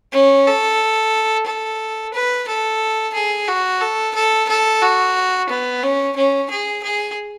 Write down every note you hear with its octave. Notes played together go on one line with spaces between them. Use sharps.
C#4
A4
A4
B4
A4
G#4
F#4
A4
A4
A4
F#4
B3
C#4
C#4
G#4
G#4